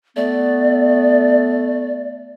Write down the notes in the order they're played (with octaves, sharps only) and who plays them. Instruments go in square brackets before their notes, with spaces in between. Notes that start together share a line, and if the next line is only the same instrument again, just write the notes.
[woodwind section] A3 B3 [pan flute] D5